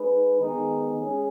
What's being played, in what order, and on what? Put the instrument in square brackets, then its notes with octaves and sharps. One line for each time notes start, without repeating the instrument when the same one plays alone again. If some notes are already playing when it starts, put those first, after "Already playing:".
Already playing: [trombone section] G#3 D#4 G#4 B4
D#3 G#3 B3 D#4 G#4
G#3 C#4 G#4